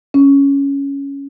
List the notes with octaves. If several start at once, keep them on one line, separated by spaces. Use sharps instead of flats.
C#4